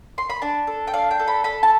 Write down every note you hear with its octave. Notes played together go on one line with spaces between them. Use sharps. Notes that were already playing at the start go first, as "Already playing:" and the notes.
C6
B5
D4 A5
A4
G5
D4 F5
G5
A4
B5
A4 B5
A5